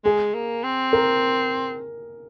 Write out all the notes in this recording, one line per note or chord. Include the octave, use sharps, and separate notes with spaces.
G#3 G#4
A#3
C4
A#4